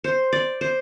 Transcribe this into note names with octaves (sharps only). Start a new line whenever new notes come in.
C5
D5
C5